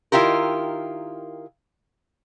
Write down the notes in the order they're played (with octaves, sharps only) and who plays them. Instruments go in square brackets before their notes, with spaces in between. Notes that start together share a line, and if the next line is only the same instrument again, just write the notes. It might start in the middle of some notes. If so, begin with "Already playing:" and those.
[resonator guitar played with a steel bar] D#3 E4 F4 G4 A#4